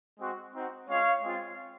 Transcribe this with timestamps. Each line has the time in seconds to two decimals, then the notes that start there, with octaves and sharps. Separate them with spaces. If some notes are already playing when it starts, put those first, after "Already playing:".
0.19 G#3 C4 F#4
0.53 C4 D#4 F#4
0.88 G#3 C#4 F4 C#5 F5
1.23 G#3 C4 F4